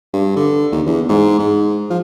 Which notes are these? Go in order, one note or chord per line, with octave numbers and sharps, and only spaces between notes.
G2
D3
D#2
E2
G#2
G#2
F3